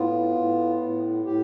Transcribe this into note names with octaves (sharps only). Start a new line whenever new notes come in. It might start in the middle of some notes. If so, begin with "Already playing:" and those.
Already playing: A2 B3 F4
A2
A2
A2 G4